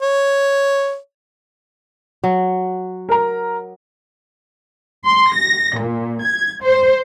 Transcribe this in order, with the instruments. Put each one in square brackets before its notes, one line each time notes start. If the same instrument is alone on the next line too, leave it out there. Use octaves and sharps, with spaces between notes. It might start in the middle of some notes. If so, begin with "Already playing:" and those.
[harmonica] C#5
[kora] F#3
[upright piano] A#4 A#5
[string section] C6
A#6
A#2
G#6
C5